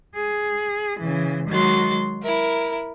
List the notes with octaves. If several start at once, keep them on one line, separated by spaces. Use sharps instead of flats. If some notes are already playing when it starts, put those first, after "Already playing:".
G#4
C#3 E3
D#3 F#3 G#3 F#4 C6 A6
E4 A#4